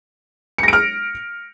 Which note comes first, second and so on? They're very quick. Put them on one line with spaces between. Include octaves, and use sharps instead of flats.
C#7 A#6 D7 F6